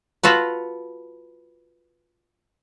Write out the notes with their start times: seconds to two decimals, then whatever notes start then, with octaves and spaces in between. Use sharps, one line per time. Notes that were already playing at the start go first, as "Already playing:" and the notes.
0.23 F4 F#4 A4 B4